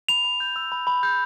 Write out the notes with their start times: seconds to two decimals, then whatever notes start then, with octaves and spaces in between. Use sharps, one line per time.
0.09 B5 F7
0.25 B5
0.40 G6
0.56 E6
0.72 B5
0.87 B5
1.03 G6